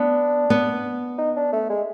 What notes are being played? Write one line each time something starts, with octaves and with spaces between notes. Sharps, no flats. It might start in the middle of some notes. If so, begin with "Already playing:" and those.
Already playing: B3 D4
B3
D#4
D4
A3
G#3